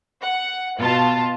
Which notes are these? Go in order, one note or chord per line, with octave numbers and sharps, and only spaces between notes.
F#5
B2 F4 A5